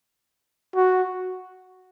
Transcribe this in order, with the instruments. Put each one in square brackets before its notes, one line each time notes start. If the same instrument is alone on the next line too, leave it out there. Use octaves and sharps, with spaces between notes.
[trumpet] F#4